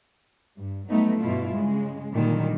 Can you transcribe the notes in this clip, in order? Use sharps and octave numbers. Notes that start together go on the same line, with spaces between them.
G2
F#3 G3 A3 B3 D#4
G2 B2 E4 F4
C#3 G#3
A#2 D3 D#3 F#3 G3